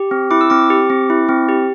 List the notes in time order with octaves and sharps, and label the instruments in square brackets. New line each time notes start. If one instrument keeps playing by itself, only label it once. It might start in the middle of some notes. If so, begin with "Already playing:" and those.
Already playing: [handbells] G4
C4
E4 D6
E6
C4 D6
G4
C4
E4
C4
G4